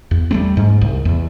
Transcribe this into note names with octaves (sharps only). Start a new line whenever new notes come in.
E2
G3 A3 C4
G#2
C2
E2